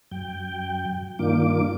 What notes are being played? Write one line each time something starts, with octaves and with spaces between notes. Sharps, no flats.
F#2 G5
G2 D#3 A#3 D4 F4 D6